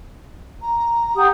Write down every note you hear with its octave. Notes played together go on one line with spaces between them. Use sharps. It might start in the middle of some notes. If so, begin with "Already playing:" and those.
A#5
G4 F#5 D#6